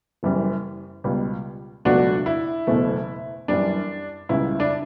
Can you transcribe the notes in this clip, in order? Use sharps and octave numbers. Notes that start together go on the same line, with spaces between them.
F#1 F#2 E3 G3
C#2 B2 G3
C#2 B2 F#3 A3 D4 F#4
E4
F#1 E2 B2 A3
F#2 E3 G3 D4
C#2 C#3 G3 E4
D4